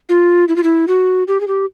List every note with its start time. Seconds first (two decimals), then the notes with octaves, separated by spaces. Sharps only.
0.09 F4
0.48 E4
0.56 F4
0.63 E4
0.88 F#4
1.27 G4
1.40 G#4
1.47 G4